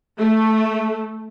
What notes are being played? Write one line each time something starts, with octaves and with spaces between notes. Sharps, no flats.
A3